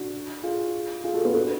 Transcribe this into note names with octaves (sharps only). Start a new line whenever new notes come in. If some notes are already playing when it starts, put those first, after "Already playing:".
Already playing: D4 F#4
F4 G#4
F4 G#4
F#4 A4
B3
D4 F#4